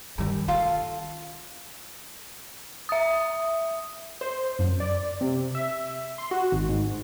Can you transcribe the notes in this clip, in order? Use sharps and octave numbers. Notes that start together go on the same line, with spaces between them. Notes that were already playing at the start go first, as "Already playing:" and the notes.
G2 D#3
D#3 C#4 F4 A4 F5
E5 D#6
C5
F#2
D5
C3
E5
C6
F#4
G#1
G#2